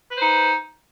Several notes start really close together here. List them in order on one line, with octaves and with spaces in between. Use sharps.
B4 C5 D#4